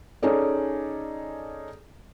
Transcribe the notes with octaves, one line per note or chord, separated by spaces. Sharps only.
C#4 D#4 G#4 A4 D5